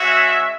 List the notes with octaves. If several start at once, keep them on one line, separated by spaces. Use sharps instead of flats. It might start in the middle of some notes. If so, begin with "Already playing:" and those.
Already playing: G#3 C#4 F#4 E5